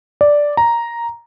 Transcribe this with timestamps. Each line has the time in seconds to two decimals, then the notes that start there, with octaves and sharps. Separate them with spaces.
0.21 D5
0.57 A#5